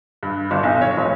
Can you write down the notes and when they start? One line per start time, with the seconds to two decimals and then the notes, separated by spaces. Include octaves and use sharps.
0.23 G2
0.51 G1
0.63 B1
0.81 C#5
0.97 F1